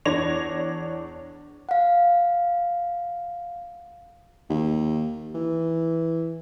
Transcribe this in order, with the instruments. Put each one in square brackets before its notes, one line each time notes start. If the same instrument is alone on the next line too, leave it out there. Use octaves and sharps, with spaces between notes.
[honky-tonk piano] E2 D4 C#5 G#6 A#6 F7
[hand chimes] F5 F#5
[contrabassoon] D#2
E3